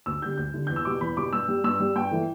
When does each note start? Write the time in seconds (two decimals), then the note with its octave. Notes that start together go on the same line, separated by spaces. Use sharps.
0.06 D2 E6
0.22 D3 G3 G6
0.37 D2 G6
0.54 D3 G3
0.67 E2 G6
0.76 E6
0.85 B2 G3 D6
1.01 E2 B5
1.17 B2 G3 D6
1.33 G2 E6
1.48 G3
1.64 G2 E6
1.80 G3
1.96 G2 G5
2.11 E3 A3